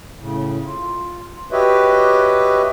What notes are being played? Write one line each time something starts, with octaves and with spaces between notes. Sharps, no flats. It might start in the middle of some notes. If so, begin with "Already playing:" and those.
A2 C#3
F4
F#4 G4 B4 C#5 D#5 E5